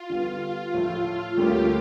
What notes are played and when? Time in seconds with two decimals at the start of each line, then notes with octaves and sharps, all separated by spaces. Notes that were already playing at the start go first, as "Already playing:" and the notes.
Already playing: F4
0.10 D3 G3 B3
0.74 A2 F3 A3
1.37 D2 D3 G3 A#3 C#4 G4